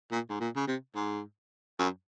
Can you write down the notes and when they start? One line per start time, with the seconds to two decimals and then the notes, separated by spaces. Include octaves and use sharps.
0.11 A#2
0.29 G#2
0.40 A#2
0.56 C#3
0.67 C3
0.95 G#2
1.79 F#2